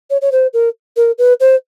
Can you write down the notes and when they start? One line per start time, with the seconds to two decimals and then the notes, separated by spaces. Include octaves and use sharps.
0.10 C#5
0.22 C#5
0.32 C5
0.53 A#4
0.96 A#4
1.18 B4
1.40 C5